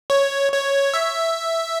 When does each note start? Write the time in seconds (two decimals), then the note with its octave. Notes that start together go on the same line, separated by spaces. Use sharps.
0.10 C#5
0.52 C#5
0.94 E5